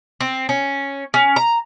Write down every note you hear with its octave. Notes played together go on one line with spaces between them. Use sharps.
C4
C#4
C#4
A#5